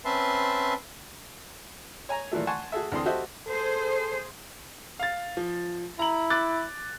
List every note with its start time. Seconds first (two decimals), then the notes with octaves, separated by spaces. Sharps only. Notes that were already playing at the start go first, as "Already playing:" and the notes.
0.05 C4 C#4 B4 E5 A5 C6
2.09 C#5 G#5 A#5
2.31 A#2 E3 F#3 A3
2.47 F#5 G#5 A5 C6 C#6
2.72 F#4 G#4 A4 E5
2.92 D2 E3 C4 A4 C6 D#6
3.06 F#4 G4 A4 C5 D#5 E5
3.47 G#4 A4 C5
4.99 F5 A6
5.37 F3
5.99 E4 A#5 F#7
6.30 D6 F#6 A6